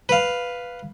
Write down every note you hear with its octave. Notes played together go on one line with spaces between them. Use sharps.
B4 F5